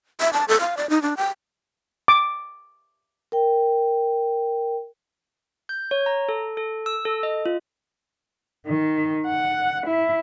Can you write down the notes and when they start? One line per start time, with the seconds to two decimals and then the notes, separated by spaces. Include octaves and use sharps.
0.20 E5
0.33 A5
0.48 A4
0.61 F5
0.77 D5
0.90 D#4
1.02 D4
1.17 G5
2.08 D6
3.32 A#4 G5
5.69 G6
5.91 C#5
6.06 A#5
6.29 A4
6.57 A4
6.86 E6
7.05 A4
7.23 D#5
7.46 F4
8.67 D#3
9.27 F#5
9.87 E4